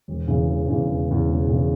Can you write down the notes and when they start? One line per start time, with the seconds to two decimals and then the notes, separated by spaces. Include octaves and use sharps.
0.08 E1
0.28 E2 C#3 E3
0.48 E1
0.68 E2 C#3 E3
0.88 E1
1.09 E2 C#3 E3
1.29 E1
1.48 E2 C#3 E3